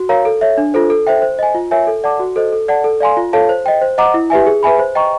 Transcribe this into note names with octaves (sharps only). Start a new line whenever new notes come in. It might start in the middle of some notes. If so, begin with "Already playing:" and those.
Already playing: F#4
A#4 C#5 F5 A#5
A4
C#5 E5
D4
F4 A4 C5
A4
C5 E5 G5
C5
D#5 G#5
F4
A#4 C#5 E5 G#5
A4
D5 F#5 A5 D6
F#4
A4 C5 D#5
A4
D5 F#5 A5
A4
D5 F5 G#5 C6
F4
A4 C#5 F5 A5
C5
D#5 G5
C5
D#5 F#5 A#5 D6
E4
G4 B4 E5 G#5
G#4
B4 E5 G#5 B5
C5
D#5 G5 A#5 C#6